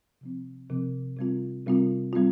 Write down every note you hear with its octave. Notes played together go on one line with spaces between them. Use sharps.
C3 F3 C4
C3 F3 C4
C3 G3 C4 F4
C3 G3 C4 F4
G3 C4 F4